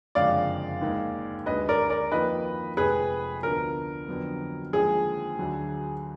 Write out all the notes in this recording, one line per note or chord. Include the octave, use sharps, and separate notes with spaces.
F#1 F2 D3 G#3 D5 F5
D#2 D#3 G#3
D2 D3 G#3 B4 D#5
A#4 D5
A#4 D5
F2 D#3 A#3 F4 B4 D#5
F1 F2 F3 G#3 G#4 B4
D2 D3 F3 B3 D4 A#4
F2 D3 F#3 B3
D#2 D3 F3 G#3 G#4
D2 D3 F#3